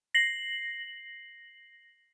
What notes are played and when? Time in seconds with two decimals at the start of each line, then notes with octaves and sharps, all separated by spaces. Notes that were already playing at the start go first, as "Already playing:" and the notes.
0.14 A#6 C7 F#7